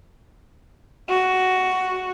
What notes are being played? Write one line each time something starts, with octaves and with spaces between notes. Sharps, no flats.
F#4